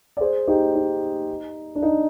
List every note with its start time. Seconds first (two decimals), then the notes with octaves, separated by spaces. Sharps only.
0.17 D5
0.21 G#4 C5
0.48 D#4 G4
0.75 D#4
1.75 D4
1.82 D#4